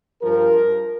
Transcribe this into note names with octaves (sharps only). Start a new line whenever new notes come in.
G2 F3 A#4